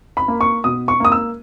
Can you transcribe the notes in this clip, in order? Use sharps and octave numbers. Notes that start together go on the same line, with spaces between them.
B5
A#3
C#6
B2 D#6
C#6
A#3 D#6
E6